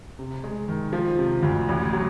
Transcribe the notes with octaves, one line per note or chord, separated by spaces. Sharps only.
C3
G#3
D#3
F3
C3
D2
A1
F#3